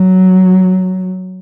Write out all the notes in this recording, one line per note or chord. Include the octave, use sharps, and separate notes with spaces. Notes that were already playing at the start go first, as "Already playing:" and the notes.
Already playing: F#3